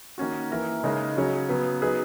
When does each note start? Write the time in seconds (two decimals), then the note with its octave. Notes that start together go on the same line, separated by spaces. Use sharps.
0.18 D#3 A#3 C#4 F#4
0.51 E3 A#3 E4 A#4
0.83 C#3 G#3 D#4 A#4 C#5
1.17 C#3 F#3 C#4 G#4 C#5
1.49 C#3 F#3 B3
1.82 F#3 B3 D#4 G#4 B4